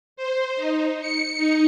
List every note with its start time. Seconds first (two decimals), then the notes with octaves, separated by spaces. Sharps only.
0.16 C5
0.56 D#4
1.01 C#7
1.37 D#4